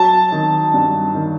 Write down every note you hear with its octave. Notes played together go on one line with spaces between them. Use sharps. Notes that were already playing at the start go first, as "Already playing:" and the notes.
Already playing: F#3 A5
D#3
G2
D#3